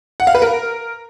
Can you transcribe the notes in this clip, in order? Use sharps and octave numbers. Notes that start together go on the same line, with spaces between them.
F#5
F5
B4
A#4